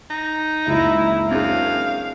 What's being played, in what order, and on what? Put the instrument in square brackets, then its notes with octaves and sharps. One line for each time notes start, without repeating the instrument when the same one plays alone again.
[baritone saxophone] D#4
[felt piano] F#1 C#2 [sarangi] E4
[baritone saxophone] F#2 [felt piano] C4 D4 G#4 [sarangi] F5